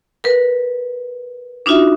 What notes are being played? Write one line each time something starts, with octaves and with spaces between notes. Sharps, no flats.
A#4 B4
D4 D#4 F4 F#4 E5